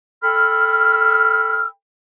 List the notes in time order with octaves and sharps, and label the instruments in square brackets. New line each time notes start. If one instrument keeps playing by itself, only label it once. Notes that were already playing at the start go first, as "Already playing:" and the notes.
[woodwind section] A4 G5 B5 E6 F6